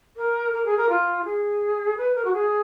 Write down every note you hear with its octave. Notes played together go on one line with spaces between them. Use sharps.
A#4
A#4
G#4
A#4
F4
G#4
B4
A#4
F#4
G#4